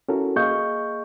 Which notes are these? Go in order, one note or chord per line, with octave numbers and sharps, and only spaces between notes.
C#4 E4 F#4 A4 A#4
A#3 G#4 D#5 F5 C#6 G6